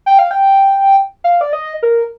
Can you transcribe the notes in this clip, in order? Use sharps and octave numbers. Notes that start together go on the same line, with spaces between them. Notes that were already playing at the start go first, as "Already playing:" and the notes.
G5
F5
G5
F5
D5
D#5
A#4